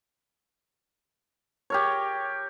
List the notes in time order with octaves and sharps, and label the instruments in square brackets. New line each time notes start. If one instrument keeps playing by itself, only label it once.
[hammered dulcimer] G4 A#4 C#5